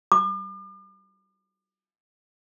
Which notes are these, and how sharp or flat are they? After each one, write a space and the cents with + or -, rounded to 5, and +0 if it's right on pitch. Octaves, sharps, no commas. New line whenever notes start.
D6 +40